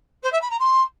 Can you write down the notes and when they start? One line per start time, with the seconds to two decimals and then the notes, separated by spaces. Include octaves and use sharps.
0.23 C5
0.32 E5
0.41 B5
0.50 A#5
0.59 C6